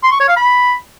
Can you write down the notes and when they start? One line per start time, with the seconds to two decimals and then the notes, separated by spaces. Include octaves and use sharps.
0.03 C6
0.12 C#6
0.20 C#5
0.28 F5
0.36 B5